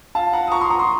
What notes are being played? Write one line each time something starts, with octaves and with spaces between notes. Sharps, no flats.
F5 A5
F#5 A#5
D#6
A#5 C#6
C6 D#6
A#5 C#6
C6 D#6